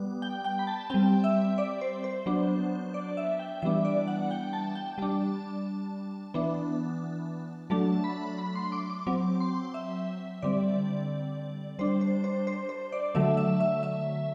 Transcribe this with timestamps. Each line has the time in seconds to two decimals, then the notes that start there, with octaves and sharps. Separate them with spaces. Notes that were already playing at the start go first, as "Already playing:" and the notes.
Already playing: G3 B3
0.22 G5
0.44 G5
0.59 B5
0.67 A5
0.90 G3 C4 G5
1.24 E5
1.58 D5
1.81 C5
2.04 C5
2.26 F#3 B3 D4
2.94 D5
3.17 E5
3.39 G5
3.62 E3 G3 B3 D4 E5
3.85 D5
4.08 F#5
4.31 G5
4.53 A5
4.75 G5
4.98 G3 D4 A5
6.34 E3 B3 D4
7.70 F#3 A3 D4 A5
8.04 B5
8.38 B5
8.55 C6
8.72 D6
8.90 D6
9.07 F#3 C4 D6
9.40 C6
9.74 E5
10.42 D3 G3 C4 D5
11.79 G3 D4 C5
12.01 C5
12.24 C5
12.47 C5
12.69 C5
12.92 D5
13.15 D3 F#3 A3 E5
13.37 E5
13.60 E5
13.83 E5